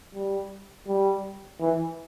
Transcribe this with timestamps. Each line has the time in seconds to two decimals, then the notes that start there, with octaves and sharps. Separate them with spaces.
0.14 G3
0.87 G3
1.60 E3